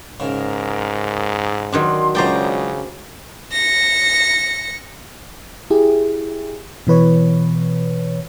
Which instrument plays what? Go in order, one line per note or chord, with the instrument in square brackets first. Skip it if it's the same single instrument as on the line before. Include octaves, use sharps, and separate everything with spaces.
[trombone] G#2 [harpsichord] C#3 [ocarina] A#4
[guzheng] D#3 F#3 D4 [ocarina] C6
[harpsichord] C#2 F#3 A#5 [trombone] C#3 [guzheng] C5 D5 G5 [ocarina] D#5
[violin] A#6 C#7
[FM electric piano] E4 G4 G#4
B2 E3 B4 C#5